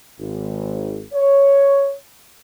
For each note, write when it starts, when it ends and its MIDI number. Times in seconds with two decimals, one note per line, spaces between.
0.19 1.02 32
1.13 1.94 73